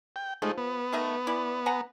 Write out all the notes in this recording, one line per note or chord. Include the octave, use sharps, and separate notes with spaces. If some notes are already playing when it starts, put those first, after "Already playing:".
G5
F3 G#3 A3 D#4
B3
D#3 A3 D#5
E3 E4 D5
F#5 G#5 A#5